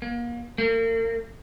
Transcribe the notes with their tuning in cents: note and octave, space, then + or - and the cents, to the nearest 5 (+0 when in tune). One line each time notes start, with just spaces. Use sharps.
A#3 +30
A#3 -45